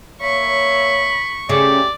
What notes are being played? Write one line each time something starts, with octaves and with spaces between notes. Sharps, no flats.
A#3 C#5 E5 B5 C#6
C#3 A3 G4 D5